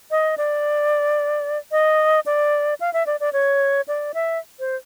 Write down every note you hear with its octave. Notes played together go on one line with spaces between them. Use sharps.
D#5
D5
D#5
D5
F5
E5
D5
D5
C#5
D5
E5
C5